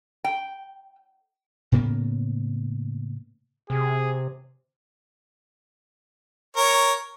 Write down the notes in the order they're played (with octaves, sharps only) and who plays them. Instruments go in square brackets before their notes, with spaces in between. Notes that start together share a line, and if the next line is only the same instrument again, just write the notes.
[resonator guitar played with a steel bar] G5
[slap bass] A2 C#3 A#3 B3
[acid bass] C3 [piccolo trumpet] G#4
[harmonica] A#4 C#5